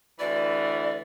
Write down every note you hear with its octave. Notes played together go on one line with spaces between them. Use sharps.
D2 E3 D5